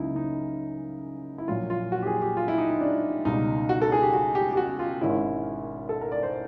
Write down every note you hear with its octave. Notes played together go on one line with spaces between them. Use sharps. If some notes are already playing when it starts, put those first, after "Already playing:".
Already playing: C#2 C#3 F#3 A#3 C#4 D#4 E4
D#4
E4
A#1 A#2 F#3 F4
F4
F#4
G4
G#4
G4
F4
E4
D#4
D#4
D4
C#2 B2 G3 D#4
F#4
A4
G#4
G4
F#4
G4
G4
F#4
F4
G#1 G#2 D#3 G#3 C#4 E4
A4
A#4
D5
C5